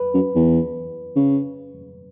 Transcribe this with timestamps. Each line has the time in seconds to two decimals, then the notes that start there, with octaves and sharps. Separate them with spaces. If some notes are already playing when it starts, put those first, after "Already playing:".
Already playing: B4
0.14 F#2
0.35 E2
1.16 C#3